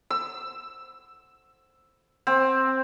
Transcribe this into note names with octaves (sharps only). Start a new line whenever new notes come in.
E6
C4